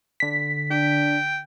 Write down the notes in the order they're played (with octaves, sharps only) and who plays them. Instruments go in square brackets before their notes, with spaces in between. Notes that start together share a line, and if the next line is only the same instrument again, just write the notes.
[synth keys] D3 B6
[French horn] D4 [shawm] G5